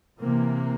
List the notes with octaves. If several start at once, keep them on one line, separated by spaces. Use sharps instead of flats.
C3 E3 A#3